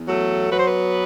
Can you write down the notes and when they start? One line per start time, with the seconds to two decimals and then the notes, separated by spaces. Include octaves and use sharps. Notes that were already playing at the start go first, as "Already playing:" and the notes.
Already playing: E2
0.08 F#3 A3 A4
0.51 F#3 B4
0.59 C5
0.66 B3 B4